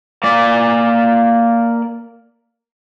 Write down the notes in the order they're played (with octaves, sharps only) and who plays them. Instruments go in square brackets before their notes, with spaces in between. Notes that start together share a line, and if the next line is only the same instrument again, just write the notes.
[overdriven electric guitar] A#3 D5